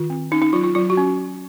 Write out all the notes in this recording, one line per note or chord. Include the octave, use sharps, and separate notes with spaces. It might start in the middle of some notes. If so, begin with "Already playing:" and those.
Already playing: D#3 F4
C4
C#4 D#4
D#4
F#3 F4
F4
F#3 F4
F#4
C#4